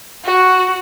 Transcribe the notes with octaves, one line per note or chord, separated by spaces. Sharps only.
F#4